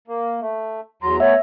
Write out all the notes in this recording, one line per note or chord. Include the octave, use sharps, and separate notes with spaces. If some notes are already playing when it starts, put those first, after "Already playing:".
A#3
A3
E2 F#3 A#5 C6
A3 B3 C#5 E5